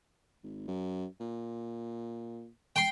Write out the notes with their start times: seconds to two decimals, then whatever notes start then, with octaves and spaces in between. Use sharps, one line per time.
0.43 G#1
0.68 F#2
1.20 A#2
2.76 G5 C6